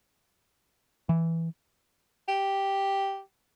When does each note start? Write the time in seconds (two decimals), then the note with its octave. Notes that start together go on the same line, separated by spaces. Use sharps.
1.09 E3
2.28 G4